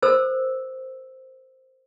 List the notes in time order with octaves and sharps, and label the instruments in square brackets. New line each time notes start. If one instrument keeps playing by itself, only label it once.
[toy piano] A4 A#4 C5 E6